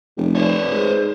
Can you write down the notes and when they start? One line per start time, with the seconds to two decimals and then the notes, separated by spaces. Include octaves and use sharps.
0.17 F1
0.35 C5 C#5
0.71 G#2